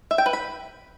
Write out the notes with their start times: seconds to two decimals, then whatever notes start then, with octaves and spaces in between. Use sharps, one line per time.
0.11 E5
0.18 G5
0.26 B4
0.33 B5